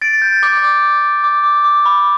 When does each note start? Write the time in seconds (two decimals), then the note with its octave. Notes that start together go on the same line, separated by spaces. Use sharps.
0.02 A6 D7
0.22 G6
0.43 D6
1.24 D6
1.44 D6
1.64 D6
1.86 B5